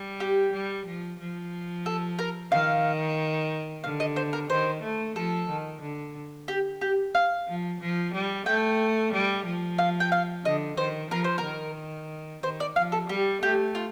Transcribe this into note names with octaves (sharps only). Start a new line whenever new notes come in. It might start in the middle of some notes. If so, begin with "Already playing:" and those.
Already playing: G3
G4
G3
F3
F3
A4
A#4
D#3 F5
D3 F5
D#5
C5
A#4
D#3 C5
A3
F3 A4
D#3
D3
G4
G4
F5
F3
F3
G3
A3 G5
G3
F3
F5
G5
F5
D3 D#5
D#3 C5
F3 A#4
C5
A#4
D#3
D#3 C5
D5
F3 F5
A4
G3 G4
A3 G4
F4